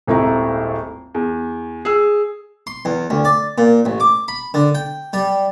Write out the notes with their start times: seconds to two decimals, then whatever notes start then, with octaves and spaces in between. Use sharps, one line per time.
0.07 D#1 G#1 A3 E4 A#5
1.15 E2
1.85 G#4 E6
2.67 C6
2.85 E2
3.10 D2
3.25 D5
3.58 A#2
3.85 A1
4.00 D6
4.28 B5
4.54 D3
4.75 G5
5.13 G3